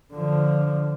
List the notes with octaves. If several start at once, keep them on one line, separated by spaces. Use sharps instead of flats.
D3 F3